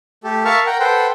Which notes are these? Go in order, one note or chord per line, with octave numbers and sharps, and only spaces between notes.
A3 G4 A4
A#4 E5 F5 A5 C#6 F6
A#4 F#5 G5 A#5
A4 B4 C5 F#5 G5